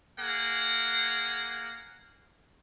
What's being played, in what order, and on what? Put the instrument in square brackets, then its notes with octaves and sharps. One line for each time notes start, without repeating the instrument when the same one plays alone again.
[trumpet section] A#3 G#4 F#5